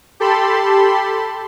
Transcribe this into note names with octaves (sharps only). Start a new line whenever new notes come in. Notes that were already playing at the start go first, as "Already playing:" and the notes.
G4 A4 A5 B5 C6